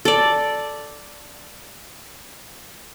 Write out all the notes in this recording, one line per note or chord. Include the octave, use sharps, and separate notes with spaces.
A4 D5